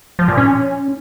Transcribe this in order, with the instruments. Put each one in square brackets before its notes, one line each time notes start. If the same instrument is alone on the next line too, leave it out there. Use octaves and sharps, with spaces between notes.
[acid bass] F3
A#2
C#4